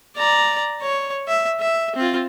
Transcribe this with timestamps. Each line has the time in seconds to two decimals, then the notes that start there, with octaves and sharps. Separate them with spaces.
0.17 D5 A#5
0.82 C#5
1.28 E5
1.60 E5
1.96 C4 F4